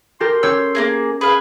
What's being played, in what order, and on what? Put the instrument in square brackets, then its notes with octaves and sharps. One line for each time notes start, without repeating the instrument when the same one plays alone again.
[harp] G4 A4 A#4 [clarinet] C6
[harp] C#4 G4 C#5 [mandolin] E6
[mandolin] A#3 D#4 G#4
[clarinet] G#4 [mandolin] B4 F5